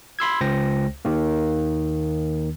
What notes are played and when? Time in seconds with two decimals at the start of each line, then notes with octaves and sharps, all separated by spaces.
0.19 B5 C6 E6 G#6
0.41 C#2 C5 G5 A#6
1.05 D#2 D#3 A#3